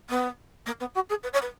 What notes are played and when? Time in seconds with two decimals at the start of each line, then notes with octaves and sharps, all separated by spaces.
0.09 B3
0.66 A#3
0.80 B3
0.95 F#4
1.09 G#4
1.23 B4
1.33 C#5
1.42 B4